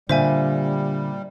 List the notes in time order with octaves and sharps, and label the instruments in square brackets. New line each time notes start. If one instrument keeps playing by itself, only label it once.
[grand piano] A#2 [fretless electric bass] D3 [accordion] G3 [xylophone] C5 E5 G#5